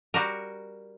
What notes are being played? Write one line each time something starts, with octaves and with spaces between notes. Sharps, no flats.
G3 F#4 A#4